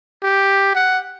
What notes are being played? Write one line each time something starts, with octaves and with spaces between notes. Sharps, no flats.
G4
F#5